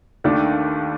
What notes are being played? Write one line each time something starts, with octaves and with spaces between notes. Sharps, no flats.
D#2 D#3 A3 D4